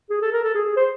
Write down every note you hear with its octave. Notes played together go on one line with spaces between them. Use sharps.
G#4
A4
A#4
A4
G#4
G#4
C5